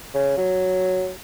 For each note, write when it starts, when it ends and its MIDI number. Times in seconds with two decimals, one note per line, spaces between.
0.15 0.35 49
0.37 1.11 54